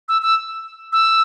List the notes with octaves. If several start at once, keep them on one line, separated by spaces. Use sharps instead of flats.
E6
E6
E6